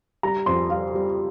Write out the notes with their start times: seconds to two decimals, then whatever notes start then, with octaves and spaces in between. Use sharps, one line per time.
0.23 G3 A#5
0.46 F2 C6
0.70 G3 F5
0.94 G3